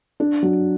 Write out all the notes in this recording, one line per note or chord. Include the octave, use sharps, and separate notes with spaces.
D4
F#3